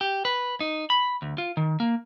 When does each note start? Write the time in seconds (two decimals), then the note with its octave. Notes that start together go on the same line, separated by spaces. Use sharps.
0.01 G4
0.25 B4
0.60 D#4
0.90 B5
1.22 D2
1.38 F4
1.57 D#3
1.80 A#3